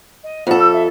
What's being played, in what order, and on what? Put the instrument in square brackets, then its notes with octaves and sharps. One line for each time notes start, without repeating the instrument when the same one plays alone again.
[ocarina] D#5
[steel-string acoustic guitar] F2 A4 [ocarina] F#5
[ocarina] E6
E5